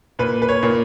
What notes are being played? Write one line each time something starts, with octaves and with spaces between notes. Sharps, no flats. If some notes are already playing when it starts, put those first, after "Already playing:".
A#2 B4
B4
C#5
A#2